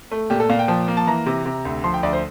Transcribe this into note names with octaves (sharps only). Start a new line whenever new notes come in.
A3
A#2 G4
A4
A#2 F5
G5
F3
A#3
A5
E3 A#5
C3
C3
D2
F3 C6
G5
D2 D5
C5